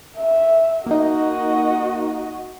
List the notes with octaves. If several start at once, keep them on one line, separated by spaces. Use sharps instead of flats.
E5
A#3 D#4 F#4 D#5